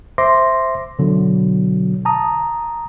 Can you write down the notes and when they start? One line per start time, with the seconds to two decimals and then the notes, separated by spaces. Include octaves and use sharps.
0.18 C5 E5 C6 D6 A#6
0.99 B2 D3 F#3
2.05 A5 A#5 D#6